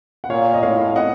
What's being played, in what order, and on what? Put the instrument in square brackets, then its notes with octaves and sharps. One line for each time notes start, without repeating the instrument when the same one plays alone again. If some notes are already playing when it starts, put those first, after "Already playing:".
[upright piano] F#5
[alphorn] A#2 [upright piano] C#5 F5
[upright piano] D#5
[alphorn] A2 [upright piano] C#5 F5
[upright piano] D#5 F#5